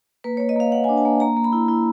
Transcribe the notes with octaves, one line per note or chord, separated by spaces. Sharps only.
A#3 B4
A#3 C#5
D#5
A#3 F5
A#3 F#5
D4 G#5
A5
A#3
A#3 A#5
A#3
B5
E4
E4